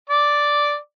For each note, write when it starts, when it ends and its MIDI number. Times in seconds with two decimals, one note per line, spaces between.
0.10 0.76 74
0.10 0.76 86